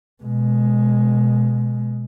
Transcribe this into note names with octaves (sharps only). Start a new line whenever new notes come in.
B2 G#3